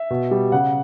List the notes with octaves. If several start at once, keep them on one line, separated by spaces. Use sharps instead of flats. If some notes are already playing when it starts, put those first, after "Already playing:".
Already playing: E5
B2
G3
C#3 F#5